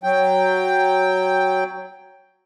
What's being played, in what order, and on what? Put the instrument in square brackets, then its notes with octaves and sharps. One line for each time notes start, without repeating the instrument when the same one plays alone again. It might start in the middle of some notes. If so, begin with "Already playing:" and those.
[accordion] F#3 G5